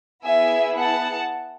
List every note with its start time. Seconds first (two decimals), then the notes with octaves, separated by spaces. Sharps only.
0.24 B3 E4 G#4 E5 G#5
0.78 F#5 A5